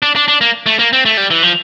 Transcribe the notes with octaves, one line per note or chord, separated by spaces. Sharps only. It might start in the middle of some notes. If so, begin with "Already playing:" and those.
D4
D4
D4
A#3
A3
A#3
C4
A3
G3
E3
F3